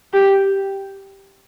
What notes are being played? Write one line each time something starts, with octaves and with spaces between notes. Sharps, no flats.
G4